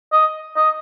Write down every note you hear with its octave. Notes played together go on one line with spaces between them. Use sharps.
D#5
D#5